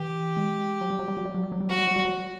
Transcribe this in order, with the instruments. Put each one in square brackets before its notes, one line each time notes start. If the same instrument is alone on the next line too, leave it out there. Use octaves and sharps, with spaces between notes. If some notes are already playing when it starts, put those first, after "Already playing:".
Already playing: [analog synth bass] E3 [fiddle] G4
[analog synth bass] G#3
F#3
G3
F#3
G3
F#3
G3
F#3
G3
F#3
G3
[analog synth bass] F#3 [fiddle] F#4
[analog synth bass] G3
F#3
G3
F#3